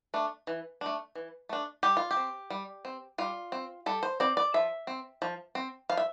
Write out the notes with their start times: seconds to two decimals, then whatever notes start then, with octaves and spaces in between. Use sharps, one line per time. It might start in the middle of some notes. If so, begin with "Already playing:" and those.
0.14 A3 D4
0.47 E3
0.81 A3 D4
1.15 E3
1.49 A3 D4
1.83 G3 G4
1.97 F4
2.11 G4
2.16 C4
2.50 G3
2.85 C4
3.18 G3 F4
3.52 C4
3.86 G3 A4
4.03 C5
4.20 C4 D5
4.37 D5
4.54 F3 E5
4.87 C4
5.22 F3
5.55 C4
5.89 F3 F5
5.97 E5